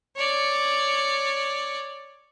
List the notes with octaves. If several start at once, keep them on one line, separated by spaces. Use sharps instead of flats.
C#5 D5